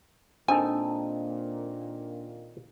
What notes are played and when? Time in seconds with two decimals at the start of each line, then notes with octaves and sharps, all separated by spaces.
0.48 A#2 D#3 A#3 C4 D4 D#4 A4 G#5